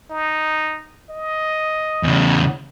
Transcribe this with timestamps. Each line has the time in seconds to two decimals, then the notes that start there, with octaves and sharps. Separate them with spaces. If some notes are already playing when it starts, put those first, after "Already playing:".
0.10 D#4
1.10 D#5
2.03 E2 C#3